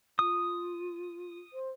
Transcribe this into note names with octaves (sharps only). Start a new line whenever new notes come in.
F4 D#6
C5